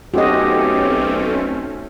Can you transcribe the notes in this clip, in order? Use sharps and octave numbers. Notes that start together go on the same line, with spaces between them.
B1 A3 C4 C#4 F#4 G4 D#5